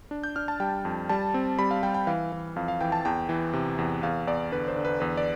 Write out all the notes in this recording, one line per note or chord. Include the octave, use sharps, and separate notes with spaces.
D4
G6
D4 F6
A5
G3 G5
F2
G3 A5
C4
G3 B5
F5
G3 G5
G5
E3 F5
E3
F2 F5
F5
E3 G5
A5
E2 G5
E3
C3
E2
E2 F5
E2 D5
D3 B4
C5
D3
B4
E2 B4
D5